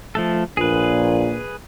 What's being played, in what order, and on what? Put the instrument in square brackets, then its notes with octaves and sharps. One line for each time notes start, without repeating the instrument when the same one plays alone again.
[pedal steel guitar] F3 A3 A4
[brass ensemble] A#1 A#2 [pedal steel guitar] G#4 B4